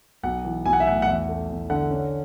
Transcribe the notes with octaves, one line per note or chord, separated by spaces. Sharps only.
B1 F#5
E3
B1 G#5
F#5
E5
A2 F#5
F#5
E2 E5
A3
E2
D3 F#5
C#4